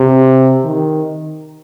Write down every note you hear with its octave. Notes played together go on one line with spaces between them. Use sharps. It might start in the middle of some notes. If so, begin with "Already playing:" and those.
Already playing: C3
D#3